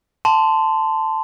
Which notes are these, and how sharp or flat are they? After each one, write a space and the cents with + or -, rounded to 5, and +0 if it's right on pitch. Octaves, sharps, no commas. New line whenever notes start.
A5 +0 C6 -15